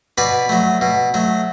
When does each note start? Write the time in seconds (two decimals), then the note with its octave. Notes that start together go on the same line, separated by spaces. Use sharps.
0.18 B2 B4 D5
0.49 F#3 A3
0.81 B2
1.14 F#3 A3